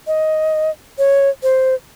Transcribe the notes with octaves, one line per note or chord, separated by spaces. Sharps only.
D#5
C#5
C5